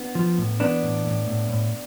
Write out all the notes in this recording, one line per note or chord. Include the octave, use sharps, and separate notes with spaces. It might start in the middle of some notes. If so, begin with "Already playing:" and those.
Already playing: B3 D4
F3
A2
E3 B3 D4
A2
A2
A2
A2